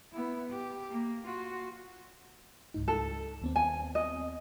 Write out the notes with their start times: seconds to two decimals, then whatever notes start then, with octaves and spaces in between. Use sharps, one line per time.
0.13 B3 E4
0.50 G4
0.90 A#3
1.26 F4 F#4
2.74 C#2 G#2 D#4
2.88 A4
3.42 D#2 B3 C4
3.56 G#5
3.95 D#5